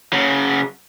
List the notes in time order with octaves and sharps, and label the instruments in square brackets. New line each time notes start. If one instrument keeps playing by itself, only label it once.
[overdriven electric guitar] C#3 F#3